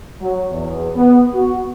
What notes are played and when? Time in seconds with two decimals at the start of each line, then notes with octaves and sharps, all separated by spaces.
0.22 F#3
0.51 E2
0.94 B3
1.34 F#4